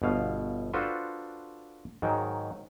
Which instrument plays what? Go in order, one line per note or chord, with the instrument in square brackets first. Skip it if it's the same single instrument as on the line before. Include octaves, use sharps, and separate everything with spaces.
[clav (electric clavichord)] G1 B2 F5
D4 F4 F#4 A4 B4 C5
G#2 D#3 F#3